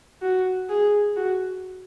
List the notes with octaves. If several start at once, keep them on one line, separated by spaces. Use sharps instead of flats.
F#4
G#4
F#4